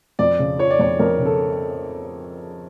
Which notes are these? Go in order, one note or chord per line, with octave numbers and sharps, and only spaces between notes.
F2 D5
C#3
F3 C#5
D5
F2 C#5
F2 A#4
C#3
A4